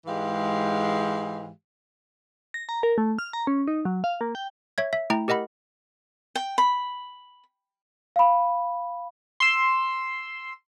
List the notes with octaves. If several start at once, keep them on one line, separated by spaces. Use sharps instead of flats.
G#2 E3 G#3 G4 F5
A#6
A#5
A#4
A3
F6
A#5
C#4
D#4
F#3
F5
A#3
G5
C#5 E5 G#6
E5
A3 E4 G5 A#5
G4 A#4 D#5 F#5 B5
G5
B5
F5 B5
C6 E6